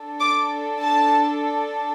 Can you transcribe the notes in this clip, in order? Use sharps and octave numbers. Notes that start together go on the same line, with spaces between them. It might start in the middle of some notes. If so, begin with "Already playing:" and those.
Already playing: D4 A4
D6
A5